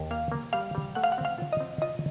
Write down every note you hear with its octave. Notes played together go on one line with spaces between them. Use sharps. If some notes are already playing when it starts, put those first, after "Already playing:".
Already playing: D#2
A#3 F5
A#3
G3 F5
G3
A3 F#5
F5
F#5
C4
F5
F4
D#5
C4
F4 D#5